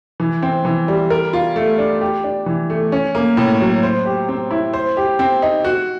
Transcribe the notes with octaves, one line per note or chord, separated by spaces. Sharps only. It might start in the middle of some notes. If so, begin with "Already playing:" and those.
E3
C4
E3
G3
A#4
F4
A3
D4
G4
D4
E3
A3
C#4
A#3
A2
F#3
C5
G4
C4
E4
C5
G4
C4
D#4
F#4